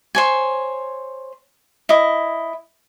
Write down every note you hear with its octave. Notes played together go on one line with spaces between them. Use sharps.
C5 C#5 G#5
E4 D#5